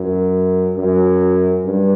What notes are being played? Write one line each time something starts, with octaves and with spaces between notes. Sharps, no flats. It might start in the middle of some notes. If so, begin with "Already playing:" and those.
Already playing: F#2
F#2
G2